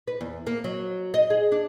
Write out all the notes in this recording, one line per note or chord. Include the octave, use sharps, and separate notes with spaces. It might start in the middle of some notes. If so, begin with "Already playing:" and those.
B4
E2
A#3
F#3
D#5
G#4
D4